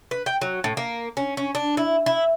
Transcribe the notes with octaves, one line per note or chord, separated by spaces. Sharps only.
B4
G5
F#3
A2
A#3
C#4
C#4
D4
E4
E4